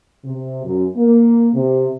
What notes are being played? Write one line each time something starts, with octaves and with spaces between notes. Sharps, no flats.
C3
F#2
A#3
C3